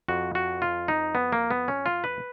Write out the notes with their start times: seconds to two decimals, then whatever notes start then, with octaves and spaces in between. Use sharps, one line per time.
0.08 F2 F3 F#4
0.35 F#4
0.62 F4
0.88 D#4
1.15 B3
1.32 A#3
1.51 B3
1.68 C#4
1.86 F4
2.04 B4